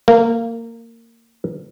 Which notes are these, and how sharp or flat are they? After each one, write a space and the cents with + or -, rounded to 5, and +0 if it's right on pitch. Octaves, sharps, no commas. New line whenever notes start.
A#3 -20